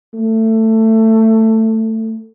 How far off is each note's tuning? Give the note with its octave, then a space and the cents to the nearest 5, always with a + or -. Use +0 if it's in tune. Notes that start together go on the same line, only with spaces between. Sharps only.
A3 +15